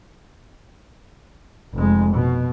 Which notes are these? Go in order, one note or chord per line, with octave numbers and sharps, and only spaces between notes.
F1 G#3
B2